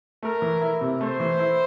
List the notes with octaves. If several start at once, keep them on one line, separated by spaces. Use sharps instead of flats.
A3 A#4
E3
E4
C3
A3 C5
E3
E4